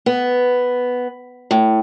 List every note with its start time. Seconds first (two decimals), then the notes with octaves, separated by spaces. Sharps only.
0.06 B3
1.51 A2